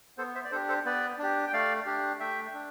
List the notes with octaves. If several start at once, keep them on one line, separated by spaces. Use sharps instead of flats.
B3 A4 C5
C5 E5
D5
D4 G4 A4 C5
A4 C5
B3 B4 D5
D4 G4
G5
A3 D5 F5
D4 G4
A3 E5 G5
D4